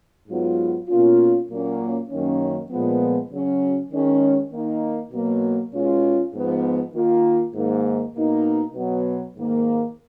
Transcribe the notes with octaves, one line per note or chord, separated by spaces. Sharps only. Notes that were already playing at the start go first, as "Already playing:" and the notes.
G#2 F#3 B3 F4
B2 A#3 C#4 F4
A#2 F#3 A#3 C#4
F#2 D#3 A#3 C#4
A#2 F3 G#3 B3
C#3 F#3 C#4
D#3 G#3 C#4
D#3 A#3 D#4
B2 F#3 A#3
B2 G#3 C#4 F4
G#2 F3 B3
D#3 A#3 F4
G#2 D#3 A#3
B2 A#3 D#4
B2 F#3 B3
G#2 D#3 A#3